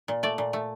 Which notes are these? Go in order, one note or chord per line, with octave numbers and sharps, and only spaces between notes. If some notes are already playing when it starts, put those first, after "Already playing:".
A#2
A3 D5
A#2
A3